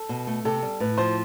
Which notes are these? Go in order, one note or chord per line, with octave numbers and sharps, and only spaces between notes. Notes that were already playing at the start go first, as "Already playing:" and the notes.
Already playing: A4
B2
A3
C3 A4
G3
A2 B4
F3 C5